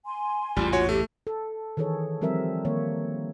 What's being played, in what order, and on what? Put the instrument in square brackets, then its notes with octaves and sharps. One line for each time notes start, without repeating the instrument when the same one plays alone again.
[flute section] G#5 C6
[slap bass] A1 E2 G#2 [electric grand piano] G3 [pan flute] F4
[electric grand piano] F#4 C#5
[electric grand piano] A3 [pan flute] G4
[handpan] A4
D#3 E3 G#4 A4 C#5
F3 G3 C4 A#4 E5
D#3 A#3 C#5